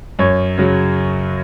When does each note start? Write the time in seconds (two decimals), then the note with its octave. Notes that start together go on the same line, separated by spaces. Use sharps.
0.19 F#2 C#5
0.58 C#3 F#3